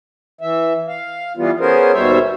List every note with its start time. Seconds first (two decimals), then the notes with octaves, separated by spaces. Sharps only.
0.41 E3 E5
0.88 F5
1.37 E3 G3 B3 F4
1.60 B3 C#4 G#4 A#4 C5
1.93 D#2 B2 G3 C5 C#5 E5